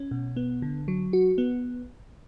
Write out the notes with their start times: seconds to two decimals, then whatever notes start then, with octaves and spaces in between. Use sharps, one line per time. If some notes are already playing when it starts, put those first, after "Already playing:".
Already playing: C#4
0.11 B2
0.36 B3
0.62 D3
0.88 F#3
1.13 F#4
1.38 B3